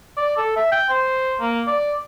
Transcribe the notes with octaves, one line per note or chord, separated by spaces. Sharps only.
D5
A4
E5
G5
C5
A#3
D5